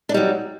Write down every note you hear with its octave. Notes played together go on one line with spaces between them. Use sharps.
F#3 G3 D4 D#4